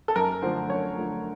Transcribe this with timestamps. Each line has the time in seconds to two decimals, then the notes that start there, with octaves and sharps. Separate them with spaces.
0.08 A4
0.16 F#2 A#4
0.42 D3 F3 A3 C5
0.69 F#2 C#5
0.97 D3 F3 A3